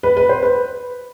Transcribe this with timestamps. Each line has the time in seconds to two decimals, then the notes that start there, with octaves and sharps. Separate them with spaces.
0.03 B4
0.17 B4
0.29 C5
0.43 B4